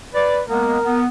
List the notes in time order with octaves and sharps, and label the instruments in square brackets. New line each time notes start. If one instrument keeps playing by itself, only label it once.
[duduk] B4 [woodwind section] D5
[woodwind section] G#3 A#3 B3 [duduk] A#4
[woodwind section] B3